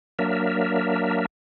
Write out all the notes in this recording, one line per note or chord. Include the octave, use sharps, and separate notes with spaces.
F#3 A#3 D4 A#4 E5